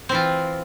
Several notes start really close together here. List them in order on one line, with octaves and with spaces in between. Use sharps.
C4 E3 F4